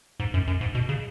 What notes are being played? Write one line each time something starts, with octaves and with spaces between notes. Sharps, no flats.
G#2
F#2
F#2
G#2
B2
C#3